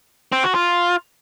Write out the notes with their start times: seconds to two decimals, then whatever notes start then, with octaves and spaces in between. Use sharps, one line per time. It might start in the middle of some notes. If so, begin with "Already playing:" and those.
0.32 C4
0.43 F#4
0.55 F4